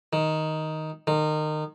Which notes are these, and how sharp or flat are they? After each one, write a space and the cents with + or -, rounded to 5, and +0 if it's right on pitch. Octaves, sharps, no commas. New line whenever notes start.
D#3 +5
D#3 -25